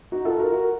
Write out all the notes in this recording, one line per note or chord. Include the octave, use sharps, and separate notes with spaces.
D#4 F#4
F4 A4
F#4 A#4
F#4 A#4